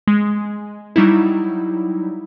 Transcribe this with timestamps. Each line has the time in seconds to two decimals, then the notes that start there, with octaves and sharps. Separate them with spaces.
0.07 G#3
0.96 F#3 G3 D#4 E4